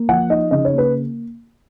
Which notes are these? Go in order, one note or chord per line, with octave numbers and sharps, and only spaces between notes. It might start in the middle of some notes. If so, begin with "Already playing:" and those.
Already playing: A#3
F3 F#5
D#4 D#5
C#3 D#5
C#5
A#3 B4